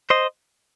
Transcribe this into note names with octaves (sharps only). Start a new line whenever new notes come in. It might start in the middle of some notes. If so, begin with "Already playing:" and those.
C5 D#5